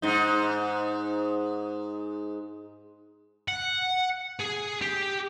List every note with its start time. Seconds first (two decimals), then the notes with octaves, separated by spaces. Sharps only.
0.02 G#2 D#4
3.48 F#5
4.40 G#4 G#5
4.82 G4